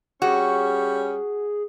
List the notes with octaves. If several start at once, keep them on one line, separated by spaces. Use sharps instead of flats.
G3 C#4 F#4 G#4